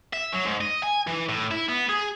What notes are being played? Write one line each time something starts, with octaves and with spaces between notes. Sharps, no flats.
E5
F#3
G#2
D#5
G#5
E3
A2
E4
B3
G#4